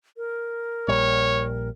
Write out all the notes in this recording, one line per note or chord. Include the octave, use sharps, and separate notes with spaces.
A#4
A#1 A#2 G3 C#5